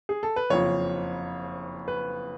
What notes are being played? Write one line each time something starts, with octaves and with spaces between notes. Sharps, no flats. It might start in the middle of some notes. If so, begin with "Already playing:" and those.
G#4
A4
B4
F#1 F2 F3 C#5
B4